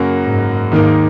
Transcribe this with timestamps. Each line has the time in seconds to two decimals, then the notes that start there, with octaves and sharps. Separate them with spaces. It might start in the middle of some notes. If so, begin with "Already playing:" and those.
Already playing: F#2 C#3 F#3 A#3
0.24 G#2
0.72 D#2 G#2 D#3 A#3 D#4 A#4